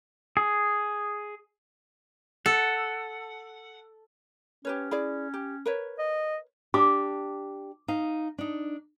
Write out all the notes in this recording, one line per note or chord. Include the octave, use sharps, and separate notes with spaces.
G#4
A4 F#5
C#4 G4 B4 C#5
E4 G#4 D5
G4
A#4 B4 C#5
D#5
D4 G4 D6
D#4 F5
D4 D#4